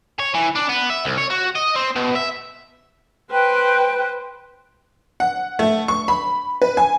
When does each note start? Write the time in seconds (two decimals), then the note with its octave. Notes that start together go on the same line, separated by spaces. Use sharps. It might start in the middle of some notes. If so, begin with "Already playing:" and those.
0.20 C#5
0.34 E3
0.56 D4
0.69 B3
0.90 E5
1.05 C2
1.18 C#5
1.30 F#4
1.56 D#5
1.76 C4
1.96 B2
2.16 E5
3.31 B4 C5 G5 F#6
5.20 F#5
5.59 A3
5.88 C#6
6.08 B5
6.62 B4
6.77 G#5